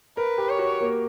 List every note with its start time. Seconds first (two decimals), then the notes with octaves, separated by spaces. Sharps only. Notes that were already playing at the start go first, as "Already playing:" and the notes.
0.17 A#4 B4
0.38 G4
0.49 C#5
0.58 F#4
0.80 A#3